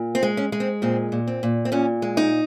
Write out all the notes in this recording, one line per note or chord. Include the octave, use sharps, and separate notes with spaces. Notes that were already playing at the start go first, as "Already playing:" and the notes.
Already playing: A#2
C4
G#3
C#4
G#3
C4
A#2 C4
A#2
C4
A#2
C4
A#2 C#4
G#3
D#4